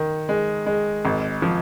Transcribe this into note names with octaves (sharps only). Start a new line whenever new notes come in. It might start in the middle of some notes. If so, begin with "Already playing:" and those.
Already playing: D#3
G#3
G#3
G#1
F3